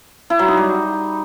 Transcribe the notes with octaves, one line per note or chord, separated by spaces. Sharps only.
E4
F#3
D#4
G3